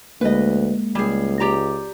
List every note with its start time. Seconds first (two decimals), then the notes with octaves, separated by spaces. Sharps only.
0.21 D2 G#3 A#3 B4 D#5
0.95 C#2 G3 G#4
1.40 G4 D5 A#5